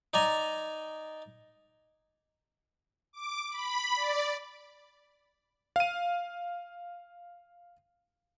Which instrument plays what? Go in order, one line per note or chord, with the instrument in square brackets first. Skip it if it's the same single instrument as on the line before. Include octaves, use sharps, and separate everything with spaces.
[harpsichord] D#4 D5 G#5 A#5
[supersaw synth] D6
B5
D5
[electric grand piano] F5 D#7